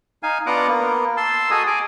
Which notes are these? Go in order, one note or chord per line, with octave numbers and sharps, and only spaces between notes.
D#4 F5 G#5
B3 D4 F4 F#5 A#5 D6
A#3 B3
A5 C6 E6
F#4 G#4 A4 D#5 G#5 D#6
G#4 G#5 D6